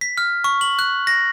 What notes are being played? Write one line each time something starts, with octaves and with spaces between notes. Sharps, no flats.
B6
F6
C#6
F#7
F#6
A#6